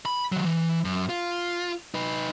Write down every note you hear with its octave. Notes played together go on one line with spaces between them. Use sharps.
B5
D#3 F#3
E3
F#2
F4
D#4 B4